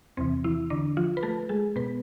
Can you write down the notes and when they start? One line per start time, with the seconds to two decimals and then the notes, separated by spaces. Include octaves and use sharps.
0.17 E2 C3 E3 C4
0.44 E3 E4
0.70 D3 D4
0.97 F3 F4
1.17 B4
1.23 A3 A4
1.49 G#3 G#4
1.76 B2 B3 B4